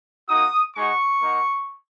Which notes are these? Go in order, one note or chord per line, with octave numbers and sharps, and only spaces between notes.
A#3 D#4 F#4 D#6
G#3 D#4 F#4 C#6
A#3 D#4 F#4